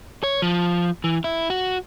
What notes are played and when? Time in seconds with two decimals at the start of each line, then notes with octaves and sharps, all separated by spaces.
0.23 C#5
0.42 F3
1.04 E3
1.24 E4
1.50 F#4